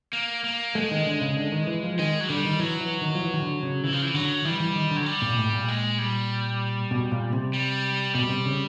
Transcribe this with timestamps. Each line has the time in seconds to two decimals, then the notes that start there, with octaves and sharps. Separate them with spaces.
0.13 A#3
0.44 A#3
0.75 G#3 A3
0.91 D#3
1.06 D3
1.21 C#3
1.37 D3
1.52 D#3
1.67 E3
1.84 F3
1.99 D#3 G#3
2.21 F#3
2.29 D3 G3
2.45 D#3
2.59 E3 F#3
2.81 E3
3.01 D#3
3.15 F3
3.21 E3
3.33 D#3
3.42 D3
3.63 C#3
3.83 C#3 E3
3.93 F3
4.02 E3
4.14 D3 F#3
4.45 E3 G3
4.60 E3
4.76 D#3
4.91 D3
4.96 F#3
5.06 G3
5.22 A#2
5.38 A2
5.53 A#2
5.68 G#3
5.99 G3
6.91 B2
7.12 A#2
7.32 C3
7.53 G3
8.14 B2 G3
8.29 C3
8.46 C#3